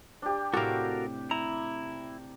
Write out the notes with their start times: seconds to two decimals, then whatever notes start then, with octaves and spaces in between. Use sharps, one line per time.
0.22 D4 G4
0.54 A2 C3 C4 F#4 A4 A#4 F5
1.31 E4 A#5